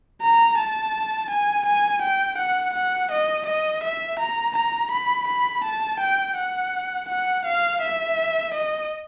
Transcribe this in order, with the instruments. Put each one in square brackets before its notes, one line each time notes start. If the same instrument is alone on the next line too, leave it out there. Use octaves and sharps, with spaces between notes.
[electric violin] A#5
A5
G#5
G#5
G5
F#5
F#5
D#5
D#5
E5
A#5
A#5
B5
B5
A5
G5
F#5
F#5
F5
E5
D#5